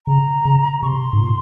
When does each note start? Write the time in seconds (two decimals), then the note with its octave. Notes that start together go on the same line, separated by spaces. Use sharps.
0.07 C#3 A#5
0.45 C#3
0.82 C3 C#6
0.87 C6
1.13 G#2
1.20 A#2